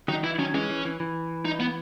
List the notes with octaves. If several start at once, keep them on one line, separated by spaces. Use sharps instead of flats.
D#3 F#3 D#4
E3 E4
D#3 F#3 C#4
E3 G#3 C#4
E3
E3
E3
D#4
B3